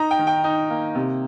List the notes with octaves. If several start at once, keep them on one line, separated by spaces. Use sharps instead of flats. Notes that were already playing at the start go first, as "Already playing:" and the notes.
Already playing: D#4 A#5
G5
D#3
G5
D#4
A#3
C3